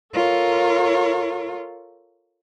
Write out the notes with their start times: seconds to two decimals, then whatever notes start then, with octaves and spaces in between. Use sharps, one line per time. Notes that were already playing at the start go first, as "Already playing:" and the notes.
0.13 F4 A4 A#4 C#5